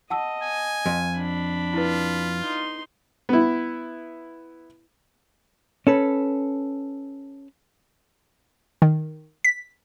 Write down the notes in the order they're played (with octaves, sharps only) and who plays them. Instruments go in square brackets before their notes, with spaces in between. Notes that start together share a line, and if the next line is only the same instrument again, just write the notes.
[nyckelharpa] D#5 [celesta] F#5 A5 E6
[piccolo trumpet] G#5
[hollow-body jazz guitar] F2
[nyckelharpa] D4 B5
[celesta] E4 B4 [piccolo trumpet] F4
[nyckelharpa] D#4 C6
[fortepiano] B3 E4
[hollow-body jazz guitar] C#4 A4 B4
[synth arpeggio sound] D#3
B6